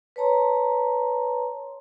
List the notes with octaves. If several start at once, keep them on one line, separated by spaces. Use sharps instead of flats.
B4 C#5 A5 A#5 C6